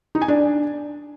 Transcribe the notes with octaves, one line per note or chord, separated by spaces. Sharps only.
D#4
G#5
D4